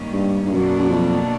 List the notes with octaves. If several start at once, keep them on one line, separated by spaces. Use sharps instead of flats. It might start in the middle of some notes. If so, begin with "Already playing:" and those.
Already playing: G#2 D#3 G3 A#3 C#4
G2
G2
F#2 B2 F#3 A#3 D4
F#2
F2